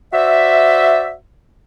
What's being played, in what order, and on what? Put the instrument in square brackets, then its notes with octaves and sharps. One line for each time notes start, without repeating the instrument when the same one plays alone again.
[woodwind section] F#4 C5 D5 E5